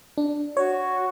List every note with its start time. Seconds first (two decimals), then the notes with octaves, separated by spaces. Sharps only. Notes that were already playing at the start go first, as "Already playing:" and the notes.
0.18 D4
0.57 F#4 C#5